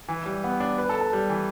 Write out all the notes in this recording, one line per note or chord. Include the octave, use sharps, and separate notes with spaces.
E3
G3
B3
D4
B4
A4
A4
G3
E3